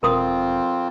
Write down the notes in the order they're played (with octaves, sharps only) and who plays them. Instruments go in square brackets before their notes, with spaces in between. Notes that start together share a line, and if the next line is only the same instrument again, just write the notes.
[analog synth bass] E1 [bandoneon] F2 C4 F4 [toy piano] A#4 C6 D#6